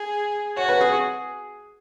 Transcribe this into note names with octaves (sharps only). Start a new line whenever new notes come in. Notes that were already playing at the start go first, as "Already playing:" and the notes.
Already playing: G#4
F#4 C#5
B4
G#4